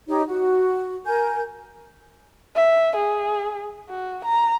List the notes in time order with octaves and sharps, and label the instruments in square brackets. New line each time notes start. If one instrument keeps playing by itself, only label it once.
[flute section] D#4 G4 C#5
F#4
A#4 G#5 G6
[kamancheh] E5
G#4
F#4
A#5